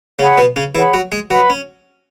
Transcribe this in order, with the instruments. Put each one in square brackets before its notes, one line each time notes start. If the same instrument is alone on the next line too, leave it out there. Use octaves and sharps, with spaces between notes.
[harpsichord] C#3 C#4 [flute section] G#4 C#5 F#5 B5
[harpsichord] B2 B3
C#3 C#4
[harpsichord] E3 E4 [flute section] G#4 C#5 F#5 B5
[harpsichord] F#3 F#4
G#3 G#4
[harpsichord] F#3 F#4 [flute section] B4 F#5 B5
[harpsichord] C#4